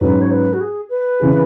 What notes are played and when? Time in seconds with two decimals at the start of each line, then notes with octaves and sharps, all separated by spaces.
0.01 G#2 F#3 C#4 B4
0.21 C#5
0.31 B4
0.53 F#4
0.61 G#4
0.90 B4
1.20 C#3 E3 B3 E4 G#4